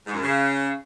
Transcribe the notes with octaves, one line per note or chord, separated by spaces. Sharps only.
G#2
F#2
C#3